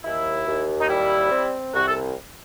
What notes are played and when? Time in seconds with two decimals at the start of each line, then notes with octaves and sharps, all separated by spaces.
0.05 D#2 E4
0.47 D#2
0.81 D#4
0.89 G3 E4
1.32 C4
1.74 C2 F#4
1.88 A4